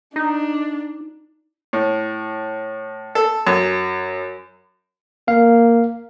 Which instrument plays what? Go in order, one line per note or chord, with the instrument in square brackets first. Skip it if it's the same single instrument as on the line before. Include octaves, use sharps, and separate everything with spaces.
[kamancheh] D4 [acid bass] D#4
[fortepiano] A2
A4
F#2
[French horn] A#3 [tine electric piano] F5